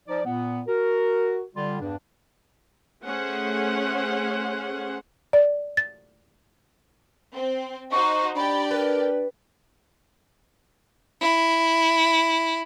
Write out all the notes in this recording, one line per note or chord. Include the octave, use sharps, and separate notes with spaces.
F3 D#4 D5
A#2 B3
F#4 A#4
D3 G3 F4
E2 G2 D4
A3 C#4 G#4 C5 F#5
D5
A6
C4
D#4 F#4 C5 C#6
D4 G4 D5 G5 B5
A#4 B4
E4